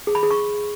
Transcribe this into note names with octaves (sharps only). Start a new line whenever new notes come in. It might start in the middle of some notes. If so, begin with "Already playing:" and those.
G#4
B5
G#4
C#6